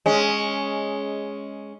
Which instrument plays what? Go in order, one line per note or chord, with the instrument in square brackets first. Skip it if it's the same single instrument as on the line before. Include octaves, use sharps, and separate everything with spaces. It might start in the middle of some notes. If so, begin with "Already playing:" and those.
[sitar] G#3 C#4